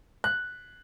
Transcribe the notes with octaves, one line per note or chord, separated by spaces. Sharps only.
F#6